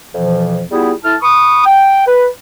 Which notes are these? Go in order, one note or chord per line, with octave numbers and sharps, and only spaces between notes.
F2 B2 E3 F3
G3 B3 E4 F4 G#4
A3 E4 A5 F6
B5 C#6 D#6
G5
B4